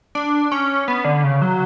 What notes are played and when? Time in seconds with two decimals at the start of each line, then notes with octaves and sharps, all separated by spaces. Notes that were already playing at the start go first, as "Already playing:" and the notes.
0.15 D4
0.51 C#4
0.88 B3
1.04 D3
1.24 C#3
1.42 F#3